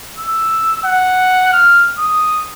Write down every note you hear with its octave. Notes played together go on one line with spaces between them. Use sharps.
E6
F#5
F6
D#6